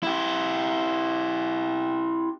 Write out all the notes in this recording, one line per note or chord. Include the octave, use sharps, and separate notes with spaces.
E4 G4